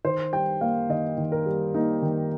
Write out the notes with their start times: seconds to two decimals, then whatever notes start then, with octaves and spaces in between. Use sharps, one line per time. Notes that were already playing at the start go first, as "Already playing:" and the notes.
0.04 D#3 C5
0.33 G3 G5
0.61 A#3 F5
0.89 D#3 D#5
1.17 D#3
1.32 A#4
1.46 G3
1.74 A#3 D#4
2.02 D#3